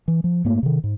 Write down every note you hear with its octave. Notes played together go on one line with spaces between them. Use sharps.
E3
F3
G#2 A3 A#3
C3 D#3
G#2